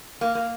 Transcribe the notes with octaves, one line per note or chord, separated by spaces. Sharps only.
A#3
A#3